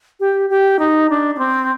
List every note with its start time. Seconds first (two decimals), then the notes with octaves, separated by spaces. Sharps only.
0.20 G4
0.50 G4
0.79 D#4
1.10 D4
1.35 D4
1.38 C4